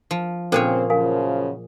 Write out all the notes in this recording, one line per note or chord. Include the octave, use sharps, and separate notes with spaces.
F3
A#2 C#3 C4 D4 G#4 A4 C5 C#5
F#2 C#3 F3 A#4 F5 G#5